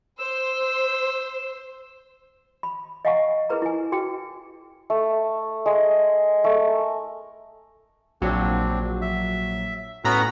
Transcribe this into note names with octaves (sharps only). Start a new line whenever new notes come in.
C5 E6
B5
D#5 F5 F#5 G#5 A#5 C#6
E4 G#4 A#4 B4 A#5
E4 G#5
F#4 G#4 G5
A3
G#3
A3
A#4
A#1 F#3 C4 D4
E5
A2 B3 C#4 F#4 A#5 B5